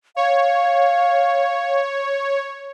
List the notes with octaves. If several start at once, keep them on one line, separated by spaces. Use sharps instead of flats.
C#5 F5